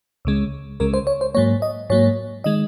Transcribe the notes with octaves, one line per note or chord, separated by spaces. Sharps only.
C#2 C#3 G#3
C#2 C#3 G#3 A#4
C5
C#5
C5
G#2 F#3 A#3 C#5
D#5
G#2 F#3 A#3 C#5
D#3 G#3 D#5